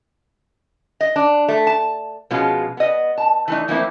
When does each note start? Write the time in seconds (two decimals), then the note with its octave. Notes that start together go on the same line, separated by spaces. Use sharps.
1.01 D#5
1.16 D4
1.48 A3
1.67 A5
2.31 B2 F3 G#3 C#4 F4 G#4
2.77 B3 D#5
3.18 A5
3.48 E3 A3 D#4
3.68 E3 F3 A3 A#3 C4 E4